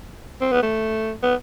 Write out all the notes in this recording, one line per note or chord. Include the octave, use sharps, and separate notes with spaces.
C4
B3
A3
B3